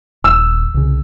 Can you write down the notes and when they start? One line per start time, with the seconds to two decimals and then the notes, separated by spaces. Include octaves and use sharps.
0.24 D#1 E6
0.74 C2 C#3